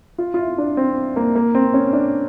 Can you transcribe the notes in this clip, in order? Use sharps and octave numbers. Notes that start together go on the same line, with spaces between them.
F4
F4
E4
D4
C4
A#3
A#3
C4
C#4
D4